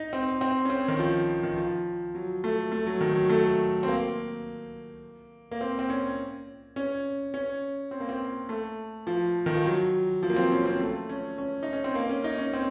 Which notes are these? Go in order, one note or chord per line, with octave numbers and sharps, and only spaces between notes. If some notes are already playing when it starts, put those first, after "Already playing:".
Already playing: D#4
C4
C4
C#4
C4
D#3
F3
D#3
F3
F#3
A3
A3
F#3
D#3
F#3
A3
C4
A#3
A#3
C4
C4
C#4
C#4
C#4
C4
A#3
C4
A3
F3
D#3
F3
F#3
F3
A#3
C4
C#4
C4
A3
C#4
C#4
D#4
C#4
C4
A#3
C#4
D#4
C#4
C4